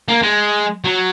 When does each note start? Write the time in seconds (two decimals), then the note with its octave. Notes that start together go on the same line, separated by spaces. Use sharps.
0.08 A#3
0.23 G#3
0.84 F#3